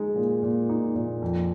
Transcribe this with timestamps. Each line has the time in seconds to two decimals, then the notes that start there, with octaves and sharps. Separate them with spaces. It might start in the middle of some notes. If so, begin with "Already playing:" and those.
Already playing: G#3 D#4
0.16 A#2
0.43 A#2
0.69 D#4
0.96 A#2
1.22 F2